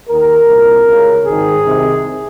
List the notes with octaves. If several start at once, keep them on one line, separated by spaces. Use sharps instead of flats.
D#2 D#3 A#4
C2 A#2
C#2 C#3
G#1 G#2 D#3 G#4
C2 C3 D#3